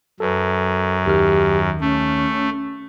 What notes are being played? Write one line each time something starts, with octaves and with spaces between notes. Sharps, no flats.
F#2 A4 B4
D#2 D#3 G4 F6
A3 C#4